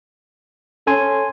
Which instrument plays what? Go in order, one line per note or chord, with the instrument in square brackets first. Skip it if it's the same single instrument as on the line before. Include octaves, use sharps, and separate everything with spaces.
[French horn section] C#4 [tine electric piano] A4 G#5 C6